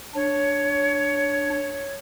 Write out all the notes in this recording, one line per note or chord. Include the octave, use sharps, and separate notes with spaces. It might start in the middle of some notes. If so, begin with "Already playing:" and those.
D4 C#5